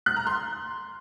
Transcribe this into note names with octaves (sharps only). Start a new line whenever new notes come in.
F#6
A#5
C6